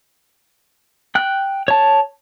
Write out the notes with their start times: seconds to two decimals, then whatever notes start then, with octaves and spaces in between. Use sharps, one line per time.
1.15 G5 F#6
1.68 C#5 A5